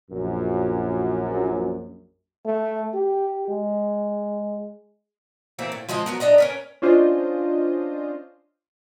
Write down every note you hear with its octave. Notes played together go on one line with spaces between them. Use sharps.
A#1 F#2
A3
G4
G#3
E3 A3 A#3 C4
A2
F3 G#3 C4 D#5
F#3 B3 A#4
D4 D5 D#5 A#5
C#4 A#4 B4
C#4 D4 F4 C5 D#5